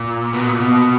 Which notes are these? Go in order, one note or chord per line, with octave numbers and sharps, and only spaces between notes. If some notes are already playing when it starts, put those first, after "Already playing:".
Already playing: A#2
B2
A#2
B2